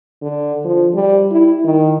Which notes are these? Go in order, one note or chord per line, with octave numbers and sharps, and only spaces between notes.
D3
F3
G3
E4
D#3